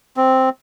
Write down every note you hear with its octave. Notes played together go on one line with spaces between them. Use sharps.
C4